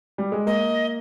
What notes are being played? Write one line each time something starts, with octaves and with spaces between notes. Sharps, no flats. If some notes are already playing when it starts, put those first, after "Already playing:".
G3
G#3
A#3 D#5